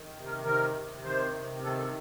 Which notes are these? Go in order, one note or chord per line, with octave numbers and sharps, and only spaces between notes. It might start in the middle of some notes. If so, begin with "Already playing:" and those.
Already playing: D#3
C3
A#4
D#3 A#4
C3
D#3 C5
C3
D#3 A4
A4